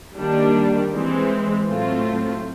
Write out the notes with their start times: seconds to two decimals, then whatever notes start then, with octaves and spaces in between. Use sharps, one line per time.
0.17 D#3 G3 A#3 D4
0.93 E3 G#3 C4
1.68 A2 F#3 A3 C4 F4